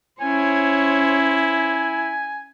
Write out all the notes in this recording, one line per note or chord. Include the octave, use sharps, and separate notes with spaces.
C#4 E4 C5 C#5 G#5